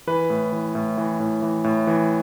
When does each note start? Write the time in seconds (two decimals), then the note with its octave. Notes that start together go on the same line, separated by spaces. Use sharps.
0.07 E3 B4
0.30 A2
0.52 E3
0.75 A2
0.98 E3
1.20 A2
1.42 E3
1.64 A2
1.87 E3